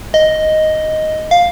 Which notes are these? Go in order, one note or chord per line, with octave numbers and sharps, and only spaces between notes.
D#5
F5